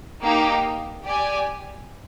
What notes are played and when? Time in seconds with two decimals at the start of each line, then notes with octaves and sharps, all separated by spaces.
0.23 A#3 D#4 G4
1.05 G4 D5 G#5